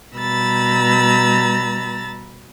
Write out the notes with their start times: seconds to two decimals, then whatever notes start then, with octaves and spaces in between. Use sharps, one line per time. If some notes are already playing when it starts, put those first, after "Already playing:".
0.15 B2 G3 A#5 B5 E6 A6